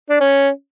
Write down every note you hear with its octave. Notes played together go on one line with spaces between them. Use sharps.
D4
C#4